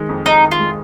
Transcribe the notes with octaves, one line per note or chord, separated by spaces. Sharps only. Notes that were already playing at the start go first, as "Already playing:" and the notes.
Already playing: D#3 G#3
F2
F2 D#4
D#3
F4
G#3